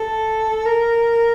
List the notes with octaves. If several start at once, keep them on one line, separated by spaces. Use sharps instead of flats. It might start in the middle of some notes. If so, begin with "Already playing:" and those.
Already playing: A4
A#4